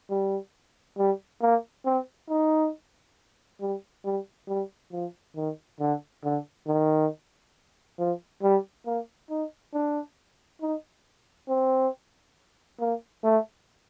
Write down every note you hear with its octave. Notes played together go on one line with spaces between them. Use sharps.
G3
G3
A#3
C4
D#4
G3
G3
G3
F3
D#3
D3
D3
D#3
F3
G3
A#3
D#4
D4
D#4
C4
A#3
A3